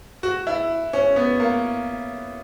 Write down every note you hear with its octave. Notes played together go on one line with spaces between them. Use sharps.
F#4
E4
C#4
B3
A#3